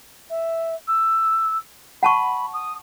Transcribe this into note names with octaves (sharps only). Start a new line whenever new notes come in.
E5
E6
F#5 A5 B5 C#6
D#6